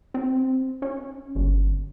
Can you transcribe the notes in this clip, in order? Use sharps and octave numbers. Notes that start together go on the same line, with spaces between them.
C4
C#4
G1